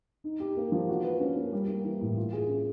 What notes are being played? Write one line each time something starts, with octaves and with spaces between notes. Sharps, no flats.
D#4
G4
A#3
F3
F#4
B4
C#4
A#3
G3
A#3
E3
A2
F4
G#4
C#4